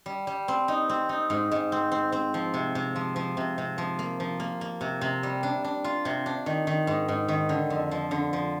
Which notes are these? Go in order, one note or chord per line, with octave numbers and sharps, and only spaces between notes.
G3
G3
C4
D#4
C4
D#4
G#2
G#2
C4
C4
C4
F3
C3
C3
F3
F3
C3
C3
F3
A#3
F3
A#3
A#3
C3
C3
G3
D4
D4
F4
C3
D4
D#3
D#3
G#2
G#2
D#3
D3
F2
F3
D3
F3